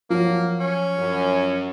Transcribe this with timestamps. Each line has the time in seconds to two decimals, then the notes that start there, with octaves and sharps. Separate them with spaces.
0.10 F3 F#3 A#3
0.59 C#4
0.98 F#2